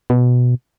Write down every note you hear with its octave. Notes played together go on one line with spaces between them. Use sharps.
B2